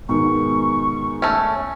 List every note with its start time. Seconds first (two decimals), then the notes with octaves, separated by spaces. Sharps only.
0.09 G#2 B2 D#3 C#6
1.22 A3 C#4